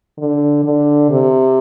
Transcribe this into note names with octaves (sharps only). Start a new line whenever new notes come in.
D3
D3
C3